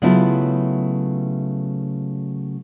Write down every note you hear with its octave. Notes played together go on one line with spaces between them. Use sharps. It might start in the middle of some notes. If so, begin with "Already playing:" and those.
C#3 F#3 A3 B3 E4 F4